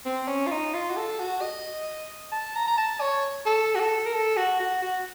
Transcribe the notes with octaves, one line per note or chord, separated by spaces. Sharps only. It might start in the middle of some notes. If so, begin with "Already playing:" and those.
C4
C#4
F4
D#4
F4
F#4
A4
F#4
D#5
A5
A#5
A#5
A5
C#5
A4
F#4
A4
A#4
A4
F#4
F#4
F#4